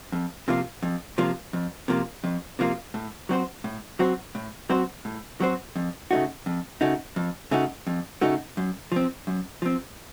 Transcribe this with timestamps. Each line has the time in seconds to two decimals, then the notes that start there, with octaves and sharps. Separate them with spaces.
0.12 F2
0.48 C3 F3 A#3 F4
0.83 F2
1.18 C3 F3 A#3 F4
1.53 F2
1.88 C3 F3 A#3 F4
2.24 F2
2.59 C3 F3 A#3 F4
2.94 A2
3.29 F#3 C4 F#4 C5
3.64 A2
3.99 F#3 C4 F#4 C5
4.35 A2
4.69 F#3 C4 F#4 C5
5.05 A2
5.40 F#3 C4 F#4 C5
5.76 F2
6.11 C#3 A3 D#4 F#4
6.46 F2
6.81 C#3 A3 D#4 F#4
7.16 F2
7.51 C#3 A3 D#4 F#4
7.87 F2
8.21 C#3 A3 D#4 F#4
8.57 F#2
8.92 F3 C4
9.27 F#2
9.62 F3 C4